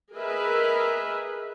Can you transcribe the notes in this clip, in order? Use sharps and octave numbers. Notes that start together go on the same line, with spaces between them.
G#4 A#4 B4 D#5 E5